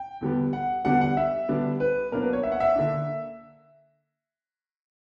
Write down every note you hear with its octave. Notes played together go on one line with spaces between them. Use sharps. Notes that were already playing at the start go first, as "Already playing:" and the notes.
Already playing: G5
E2 D3 G3 B3
F#5
E2 D3 G3 B3 D4 F#5
F#5
E5
D3 G3 B3 D4
B4
B2 F#3 A#3 D4 A#4
B4
C#5
E5
F#5
E5
D3 A#3 D4